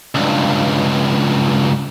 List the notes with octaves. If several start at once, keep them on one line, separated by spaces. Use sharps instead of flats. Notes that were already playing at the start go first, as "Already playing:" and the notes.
C#2 G2